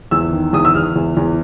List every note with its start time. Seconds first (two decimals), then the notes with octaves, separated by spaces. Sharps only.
0.11 E2 E6
0.33 D#3
0.53 E2 D#6
0.65 E6
0.74 E2 F6
0.96 E2
1.17 E2